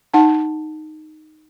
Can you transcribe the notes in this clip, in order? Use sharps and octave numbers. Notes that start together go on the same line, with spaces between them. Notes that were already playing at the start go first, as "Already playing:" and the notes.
D#4 F#5 A5